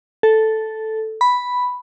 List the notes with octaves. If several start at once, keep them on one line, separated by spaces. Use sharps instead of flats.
A4
B5